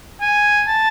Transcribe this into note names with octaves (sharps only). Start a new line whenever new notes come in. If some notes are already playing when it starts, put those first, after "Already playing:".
G#5
A5